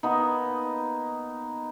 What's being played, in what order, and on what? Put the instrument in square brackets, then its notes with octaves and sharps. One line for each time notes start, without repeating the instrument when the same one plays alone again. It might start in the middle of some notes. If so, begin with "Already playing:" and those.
[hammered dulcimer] A#3 B3 D#4